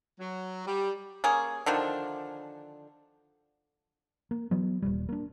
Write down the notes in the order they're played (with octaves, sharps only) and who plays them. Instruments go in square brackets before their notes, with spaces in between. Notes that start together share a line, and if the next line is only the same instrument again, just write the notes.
[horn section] F#3
G3
[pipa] A#3 C#4 G#4
D3 D#3 F3 D4
[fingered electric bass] A#3
E3 F#3 B3
D#1 A#1 G3
A#3 D4